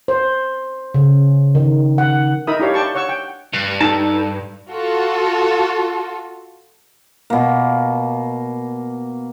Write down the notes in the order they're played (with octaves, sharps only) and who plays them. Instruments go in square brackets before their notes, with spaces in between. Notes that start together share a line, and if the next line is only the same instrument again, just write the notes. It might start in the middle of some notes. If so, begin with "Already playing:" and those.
[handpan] C5
C#3
D#3
F#5
[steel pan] D#4 A#4 E5 B5 D#6
D4 E4 G4 C#5 F5
D5 G5 A5 C#6
C#5 F#5 C#6 E6
G5
[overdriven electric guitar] G2
[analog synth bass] D#4 [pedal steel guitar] A4 A5
[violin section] F4 F#4 A4
[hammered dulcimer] B2 A#3